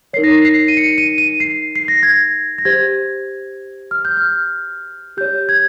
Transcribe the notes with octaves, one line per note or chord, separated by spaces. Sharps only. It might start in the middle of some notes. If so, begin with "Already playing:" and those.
D#4 A#4 C#5 C7
A#6
C7
C7
D#7
C#7
D#7
D#7
C7
C7
A#6
G#6
A#6
G4 C5 G#6
F6
G6
F6
G4 C#5 G6
G#6